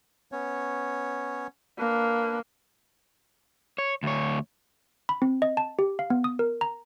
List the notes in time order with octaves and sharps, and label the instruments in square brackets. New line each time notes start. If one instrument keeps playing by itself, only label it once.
[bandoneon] B3 C#4 C#5
[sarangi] A#3 [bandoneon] D4 B4
[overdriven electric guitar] C#5
D2 C#5
[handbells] B5
C4
D#5
A5
G4
F5
B3
D#6
A#4
A#5